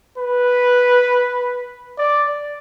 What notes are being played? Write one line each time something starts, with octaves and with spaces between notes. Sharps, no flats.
B4
D5